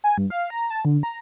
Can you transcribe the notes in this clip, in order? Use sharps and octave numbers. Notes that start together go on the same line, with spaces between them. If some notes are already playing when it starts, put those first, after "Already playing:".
G#5
G2
F5
A#5
A5
D3
A#5